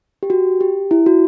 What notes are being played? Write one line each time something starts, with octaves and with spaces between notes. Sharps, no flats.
G4
F#4
G4
E4
F#4